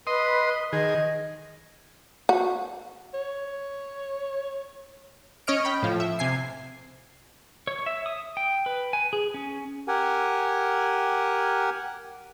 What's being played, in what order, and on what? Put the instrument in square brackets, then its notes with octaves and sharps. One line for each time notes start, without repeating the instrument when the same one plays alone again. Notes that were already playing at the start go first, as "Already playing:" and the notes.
[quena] B4 [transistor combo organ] D#5 C6
[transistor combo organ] D#3 G#4 [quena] D#5
[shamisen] F#4
[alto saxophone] C#5
[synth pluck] C#4 C#5 D#5 F6 D7
G5 B5
A2 F3
E5
C3 G#5 C7
[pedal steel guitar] C#5
E5
D#6
G5
B4
G#5
G#4
C#4
[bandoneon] G4 A#4 F#5 G#5